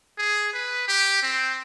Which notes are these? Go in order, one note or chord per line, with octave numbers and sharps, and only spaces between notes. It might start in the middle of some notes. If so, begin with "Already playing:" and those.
G#4
B4
G4
C4